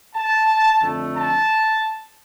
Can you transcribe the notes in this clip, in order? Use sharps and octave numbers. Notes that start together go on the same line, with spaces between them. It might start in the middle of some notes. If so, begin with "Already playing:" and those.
A5
F2 D3 A3
A5